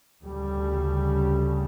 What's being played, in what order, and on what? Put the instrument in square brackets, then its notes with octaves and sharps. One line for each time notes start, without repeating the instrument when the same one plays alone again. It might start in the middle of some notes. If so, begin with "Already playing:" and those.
[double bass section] D2 C#3 G3